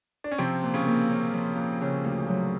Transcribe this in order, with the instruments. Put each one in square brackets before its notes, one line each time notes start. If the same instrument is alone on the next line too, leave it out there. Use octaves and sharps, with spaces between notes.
[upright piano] D4
C#4
[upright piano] C3 C4 [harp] F3
[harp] A#2
[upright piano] C#3 C#4
[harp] A#3
C#4
F3
A#2
C#3
D2
F#3